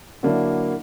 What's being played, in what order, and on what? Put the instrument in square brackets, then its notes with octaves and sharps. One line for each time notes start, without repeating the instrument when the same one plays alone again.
[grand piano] D3 F#3 A#3 D4 E4